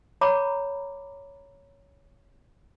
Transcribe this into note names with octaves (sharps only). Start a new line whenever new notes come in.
C#5 A#5 B5 D6